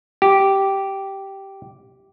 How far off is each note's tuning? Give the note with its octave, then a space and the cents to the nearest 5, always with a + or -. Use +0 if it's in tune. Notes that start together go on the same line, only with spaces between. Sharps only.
G4 -10